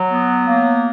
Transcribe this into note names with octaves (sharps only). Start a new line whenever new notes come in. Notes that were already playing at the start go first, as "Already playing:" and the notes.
Already playing: F#3
B3
A#3